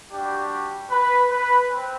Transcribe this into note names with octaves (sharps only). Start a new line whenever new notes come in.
G3 D4 F#4 G4
B4
B4
C4